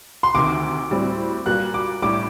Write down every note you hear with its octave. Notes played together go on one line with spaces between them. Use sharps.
C6
D2 C3 D#3 D6
A2 G3 C4 F#4
A#2 G3 A#3 F#4 F#6
D6
A2 G3 D4 D6